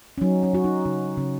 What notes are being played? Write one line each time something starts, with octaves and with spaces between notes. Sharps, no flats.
C#4
F#3 D#4
C#4
F#3 F#4
D#4
C#3 D#4
C#3 C#4